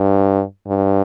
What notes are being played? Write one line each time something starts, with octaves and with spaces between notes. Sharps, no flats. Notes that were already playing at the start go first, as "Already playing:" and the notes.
Already playing: G2
G2